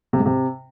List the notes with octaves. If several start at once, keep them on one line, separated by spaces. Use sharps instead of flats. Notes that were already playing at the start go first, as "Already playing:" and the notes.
C3
G#2
C3